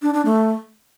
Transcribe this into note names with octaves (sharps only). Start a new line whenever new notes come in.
D4
D4
A3